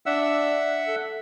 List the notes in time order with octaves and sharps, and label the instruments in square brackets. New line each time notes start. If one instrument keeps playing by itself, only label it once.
[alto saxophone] D4 [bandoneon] E5 F#5 E6
[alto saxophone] A4